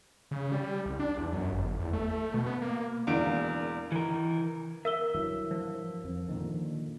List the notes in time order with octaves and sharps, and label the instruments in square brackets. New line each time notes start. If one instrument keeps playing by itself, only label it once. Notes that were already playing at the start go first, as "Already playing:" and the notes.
[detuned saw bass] C#3
G3
C2
D4
E2
F#2
G1
E2
A3
B2
B3
A#3
[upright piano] E1 E2 A#3 D4 D7
[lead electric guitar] E3 A#4
[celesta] A#4 E6 G7 [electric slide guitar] E5
[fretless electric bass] G2 E3 F#3
[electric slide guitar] F3
[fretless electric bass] F2
A#2 D3 D#3